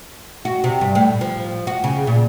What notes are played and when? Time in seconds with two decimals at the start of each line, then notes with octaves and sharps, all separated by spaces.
0.45 F#4
0.64 C3
0.81 G2
0.95 A2
1.21 F3
1.67 F#4
1.84 C#3
2.07 A#2